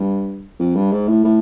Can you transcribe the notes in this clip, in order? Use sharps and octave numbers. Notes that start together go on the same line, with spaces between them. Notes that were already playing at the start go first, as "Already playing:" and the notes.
Already playing: G2
F2
G2
G#2
A2
A2